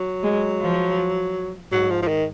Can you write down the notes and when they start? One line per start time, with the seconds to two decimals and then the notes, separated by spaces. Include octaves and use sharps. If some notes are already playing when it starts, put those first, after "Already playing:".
Already playing: F#3
0.23 G#3
0.61 F3
1.72 G#2 F#3
1.90 F3
2.02 F3
2.08 D#3